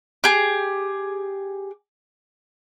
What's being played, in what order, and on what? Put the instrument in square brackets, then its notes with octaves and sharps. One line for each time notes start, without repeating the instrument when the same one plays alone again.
[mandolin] G4 G#4